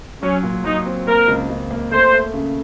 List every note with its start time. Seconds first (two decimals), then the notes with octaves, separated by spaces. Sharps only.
0.22 F#3 C#4
0.43 A#2
0.64 F#3 D#4
0.86 C4
1.07 A#3 A#4
1.28 C#2
1.49 C#2
1.71 A#3
1.91 A3 C5
2.13 A3
2.34 C#3